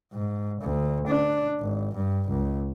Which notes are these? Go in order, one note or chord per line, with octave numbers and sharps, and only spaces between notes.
G#2
D2
D4
G#1
G2
C#2